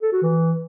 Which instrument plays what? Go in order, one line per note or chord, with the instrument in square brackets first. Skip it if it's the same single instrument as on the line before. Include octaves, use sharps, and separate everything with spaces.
[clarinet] A4
F#4
E3